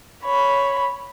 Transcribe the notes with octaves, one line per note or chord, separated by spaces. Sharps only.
C#5 B5